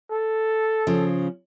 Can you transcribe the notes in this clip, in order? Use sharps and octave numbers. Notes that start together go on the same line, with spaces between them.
A4
C#3 F3